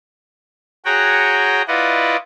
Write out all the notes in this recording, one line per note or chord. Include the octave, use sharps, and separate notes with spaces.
F#4 G#4 C#5 F#5 G5 A#5
E4 F4 B4 D5 D#5 F#5